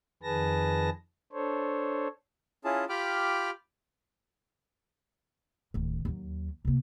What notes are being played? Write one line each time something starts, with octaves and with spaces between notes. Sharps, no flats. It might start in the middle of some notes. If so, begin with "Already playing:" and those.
F2 D#3 G#4 B4 A5 A#6
D4 A4 C5 C#5
C#4 E4 F4 G#4 A5
F4 G4 G5 B5 D6 F6
D1 D#3
D#2 F#3
C3 A#3